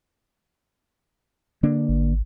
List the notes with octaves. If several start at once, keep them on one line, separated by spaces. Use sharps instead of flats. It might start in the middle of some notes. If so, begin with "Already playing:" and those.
D3 A#3 D4
G#1